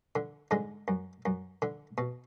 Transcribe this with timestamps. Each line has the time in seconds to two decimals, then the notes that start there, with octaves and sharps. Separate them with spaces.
0.16 D3
0.51 G#2 D3 G#3
0.88 F#2
1.26 F#2
1.62 D3
1.98 B2